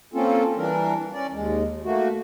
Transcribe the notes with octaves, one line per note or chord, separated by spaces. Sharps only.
A#3 C4 C#4 F4 A4
E3 G3 D4 A#4
C#4 D5
D#2 G#3
A3 A#3 F#4